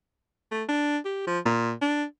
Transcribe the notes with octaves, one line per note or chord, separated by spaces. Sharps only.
A3
D4
G4
F3
A#2
D4